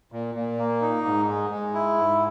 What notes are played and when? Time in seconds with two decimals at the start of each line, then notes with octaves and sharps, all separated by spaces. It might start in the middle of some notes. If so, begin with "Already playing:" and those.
0.12 A#2
0.35 A#2
0.58 A#3
0.81 D#4
1.05 G#2
1.28 G#3
1.50 G#3
1.74 E4
1.98 G#2